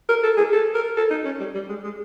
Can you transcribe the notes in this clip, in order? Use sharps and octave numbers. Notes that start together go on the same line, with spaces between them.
A#4
A4
G#4
A4
A#4
A4
D#4
C#4
G3
G3
G#3
G#3